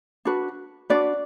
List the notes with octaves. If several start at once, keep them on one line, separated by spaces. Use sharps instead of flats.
D4 F#4 B4
D4 F#4 B4 D5